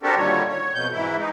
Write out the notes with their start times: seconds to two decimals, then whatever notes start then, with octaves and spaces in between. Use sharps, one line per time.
0.03 C4 D4 F#4 G4 A4 A#4
0.16 A#2 D3 D#3 G3 C#5
0.49 C#5
0.74 F2 B2 G6
0.92 G#2 E3 E4
1.18 D#4